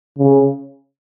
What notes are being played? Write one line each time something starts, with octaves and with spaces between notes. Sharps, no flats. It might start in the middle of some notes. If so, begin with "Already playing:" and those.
C#3